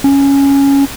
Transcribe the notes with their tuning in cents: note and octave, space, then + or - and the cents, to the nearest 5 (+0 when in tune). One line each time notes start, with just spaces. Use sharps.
C#4 +0